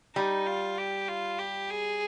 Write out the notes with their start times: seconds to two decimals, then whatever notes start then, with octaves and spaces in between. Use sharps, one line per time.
0.16 G3 D#4
0.47 F4
0.78 G4
1.08 F4
1.39 G4
1.70 G#4